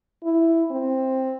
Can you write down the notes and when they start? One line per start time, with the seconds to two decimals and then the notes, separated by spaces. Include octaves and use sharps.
0.24 E4
0.71 C4